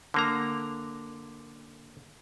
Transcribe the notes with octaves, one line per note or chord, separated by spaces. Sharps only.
D3 A#3 A#5